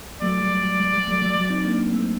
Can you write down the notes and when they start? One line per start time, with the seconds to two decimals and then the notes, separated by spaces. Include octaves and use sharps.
0.22 F#3 A3 D5
0.41 G3
0.61 G3
0.80 G3
0.94 G3
1.08 F#3 A3
1.22 F#3 A3
1.36 F#3
1.50 C4 D#4
1.65 A#3 D4
1.93 A3 C4